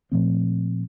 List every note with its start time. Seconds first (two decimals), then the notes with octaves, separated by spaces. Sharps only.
0.12 A#2 F3 A3 C4